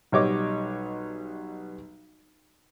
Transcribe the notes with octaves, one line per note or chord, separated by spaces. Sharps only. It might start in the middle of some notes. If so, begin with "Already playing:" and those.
B1 G3 C#5 D#5 D6